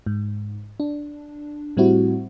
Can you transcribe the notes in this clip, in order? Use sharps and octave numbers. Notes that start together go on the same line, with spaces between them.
G#2
D4
A2 G3 C4 E4 F#4